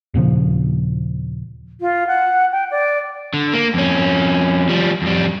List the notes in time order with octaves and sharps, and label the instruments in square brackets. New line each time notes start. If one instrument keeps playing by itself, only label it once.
[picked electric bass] D#2 A#2 C#3 F3
[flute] F4
F#5
G5
D5
[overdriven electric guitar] D3
A#3
F2 C#4
F3 G3
F2 G3